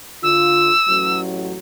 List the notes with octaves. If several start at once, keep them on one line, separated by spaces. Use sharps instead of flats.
D3 F4 E6
A1 F#3